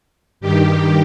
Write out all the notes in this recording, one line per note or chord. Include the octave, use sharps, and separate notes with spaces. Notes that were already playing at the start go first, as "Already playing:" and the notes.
G2 D#3 G4